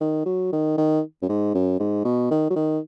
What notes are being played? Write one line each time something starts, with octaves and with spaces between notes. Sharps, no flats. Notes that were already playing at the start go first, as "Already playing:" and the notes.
D#3
F#3
D#3
D#3
F#2
G#2
F#2
G#2
B2
D#3
F#3
D#3